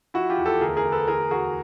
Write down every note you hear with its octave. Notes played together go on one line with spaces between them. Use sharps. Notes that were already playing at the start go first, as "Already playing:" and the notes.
F3 E4 F#4
F4 G4
E2
G4 A4
D2 G#4 A#4
G#4 A#4
D2
A4 B4
E2 G#4 A#4
E2 F#4 G#4